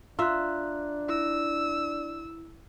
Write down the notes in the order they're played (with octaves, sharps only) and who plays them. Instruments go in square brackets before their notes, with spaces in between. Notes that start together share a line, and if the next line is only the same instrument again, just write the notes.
[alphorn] D4 [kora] F4 E5 [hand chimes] A#5 F#6
[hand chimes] E4 [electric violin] E6